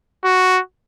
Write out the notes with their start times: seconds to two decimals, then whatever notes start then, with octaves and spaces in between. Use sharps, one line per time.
0.24 F#4